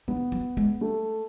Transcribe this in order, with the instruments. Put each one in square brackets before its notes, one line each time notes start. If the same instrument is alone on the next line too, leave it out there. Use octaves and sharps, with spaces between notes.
[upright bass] D#3 [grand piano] B3
[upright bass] F#3
G#3
[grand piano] A3